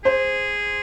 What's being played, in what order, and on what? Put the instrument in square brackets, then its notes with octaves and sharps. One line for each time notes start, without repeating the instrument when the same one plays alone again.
[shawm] G#4 [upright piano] C5